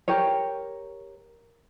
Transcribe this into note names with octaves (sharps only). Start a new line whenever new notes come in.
G4 A#4 C#5